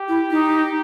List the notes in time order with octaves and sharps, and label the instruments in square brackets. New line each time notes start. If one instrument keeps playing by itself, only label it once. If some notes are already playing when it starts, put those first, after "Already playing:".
Already playing: [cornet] G4
[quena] E4
D#4